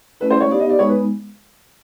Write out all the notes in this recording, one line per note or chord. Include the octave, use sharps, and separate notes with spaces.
A3 C#4 E4 B4
C5
C#5
B3 D#4 G4 C5 D5 F5
D#5
D5
G#3 B3 D#4 C#5
B4